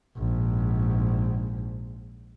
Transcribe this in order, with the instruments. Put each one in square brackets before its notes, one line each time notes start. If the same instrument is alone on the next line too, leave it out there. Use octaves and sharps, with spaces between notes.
[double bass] A#1 G#2